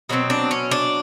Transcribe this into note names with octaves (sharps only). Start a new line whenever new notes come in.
B2 F#3 A3 C4
D4
C#4
D4